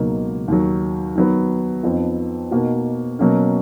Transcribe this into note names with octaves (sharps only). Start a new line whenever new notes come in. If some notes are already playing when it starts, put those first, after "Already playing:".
Already playing: C#2 B2 F#3 A#3 D#4
D#2 D#3 F#3
D#3 F#3 B3
F2 F3 B3 D#4
B2 A#3 D#4 F#4
B2 F#3 A#3 C#4